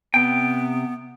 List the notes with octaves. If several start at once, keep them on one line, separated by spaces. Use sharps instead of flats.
C3 B3 G5